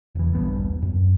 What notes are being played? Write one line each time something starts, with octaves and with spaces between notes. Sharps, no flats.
E1 E3
D#1 A#1 G2 B3
F#2